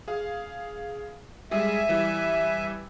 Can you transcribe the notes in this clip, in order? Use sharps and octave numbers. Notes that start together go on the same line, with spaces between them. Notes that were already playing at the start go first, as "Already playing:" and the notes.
G#4 F5
G3 G#3 G#4 E5 G#5
E3 G3